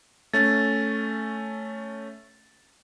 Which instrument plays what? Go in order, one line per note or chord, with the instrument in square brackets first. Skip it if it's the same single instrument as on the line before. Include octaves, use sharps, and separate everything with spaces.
[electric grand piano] A3 C#4 [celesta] A6